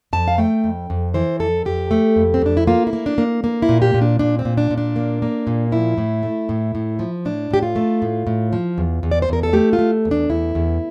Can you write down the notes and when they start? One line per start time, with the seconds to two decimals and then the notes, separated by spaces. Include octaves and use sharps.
0.13 F2 A5
0.28 F5
0.38 A3 G5
0.64 F2
0.90 F2
1.14 E3 C5
1.40 F2 A4
1.65 F2 G4
1.91 A3
2.16 F2
2.34 C4
2.42 F2 D4
2.57 E4
2.67 A#3 F4
2.87 E4
2.93 A#3
3.06 D4
3.18 A#3
3.44 A#3
3.62 E4
3.69 A#2
3.82 G4
3.94 A#2
4.02 D4
4.19 A#2 D4
4.39 C4
4.45 A#2
4.58 D4
4.71 A#2
4.78 D4
4.96 A#3
5.22 A#3
5.47 A#2
5.72 F3 E4
5.98 A2
6.23 A3
6.49 A2
6.75 A2
6.99 F3
7.25 A2 D4
7.51 A2 G4
7.63 F4
7.76 A3
8.02 A2
8.27 A2
8.53 F3
8.78 E2
9.03 E2
9.11 D5
9.22 C5
9.29 E2 A#4
9.43 A4
9.53 A3 G4
9.73 F4
9.79 A3
10.05 E2
10.11 D4
10.30 E2 E4
10.55 E2